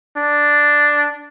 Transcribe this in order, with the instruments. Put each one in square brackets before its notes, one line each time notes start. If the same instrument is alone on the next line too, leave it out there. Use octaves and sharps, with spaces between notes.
[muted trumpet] D4